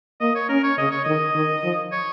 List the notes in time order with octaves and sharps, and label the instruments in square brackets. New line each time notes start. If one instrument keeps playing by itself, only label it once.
[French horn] A#3 [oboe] D#5
[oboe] C#5
[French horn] C#4 [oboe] A#4
[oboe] C#5
[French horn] C#3 [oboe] D#5
[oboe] C#5
[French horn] D#3 [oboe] D#5
[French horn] D#3
F3
[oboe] C#5